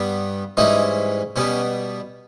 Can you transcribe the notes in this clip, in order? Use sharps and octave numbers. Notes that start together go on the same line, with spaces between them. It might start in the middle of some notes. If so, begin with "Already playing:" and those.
Already playing: G2 G3 B3
G#2 E3 G3 C#4 D#4
B2 G3 B3 C#4